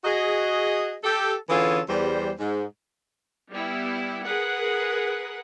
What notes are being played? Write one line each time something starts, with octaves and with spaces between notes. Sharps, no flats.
F#4 G#4 D#5
G4 A4
D3 E3 C#4 F4 G#4 A4
E2 G3 C5
G#2
G3 B3 E4
G#4 A#4 B4 F#5